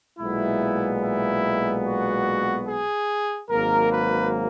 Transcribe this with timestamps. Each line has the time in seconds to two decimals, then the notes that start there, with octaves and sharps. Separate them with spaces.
0.19 B1 A#2 G#3 B3 E4
1.02 E4
1.85 F#4
2.68 G#4
3.50 G#1 G#2 F#3 A#3 A#4
3.92 B4